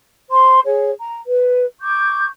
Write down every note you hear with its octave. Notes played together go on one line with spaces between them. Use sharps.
C5 C6
G#4 C#5
A#5
B4
C#6 D6 G6